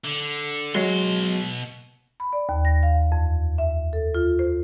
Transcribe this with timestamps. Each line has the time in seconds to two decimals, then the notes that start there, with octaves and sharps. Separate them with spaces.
0.05 D3
0.75 B2 F#3 G#3 C6
2.20 B5
2.33 D5
2.49 D#2
2.65 A#6
2.83 F5
3.12 F2
3.58 E5
3.93 A4
4.14 F4
4.39 C5